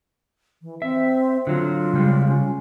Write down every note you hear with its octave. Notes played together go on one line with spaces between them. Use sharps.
E3
C4 E5
D3 F#3 F4
C#3 G3 G#3
C#4